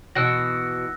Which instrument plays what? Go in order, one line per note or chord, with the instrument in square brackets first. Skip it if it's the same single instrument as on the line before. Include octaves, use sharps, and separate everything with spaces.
[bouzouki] B2 E3 F#4 [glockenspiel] E6 F#6 A#6